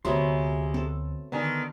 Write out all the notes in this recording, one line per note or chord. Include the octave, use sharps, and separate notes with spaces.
D2 C3 F#3 G#3 A3 B3 C6
C4 A4
D3 D#3 B3 G#5